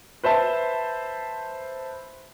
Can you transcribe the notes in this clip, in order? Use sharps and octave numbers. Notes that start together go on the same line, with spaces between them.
B4 C5 E5 A5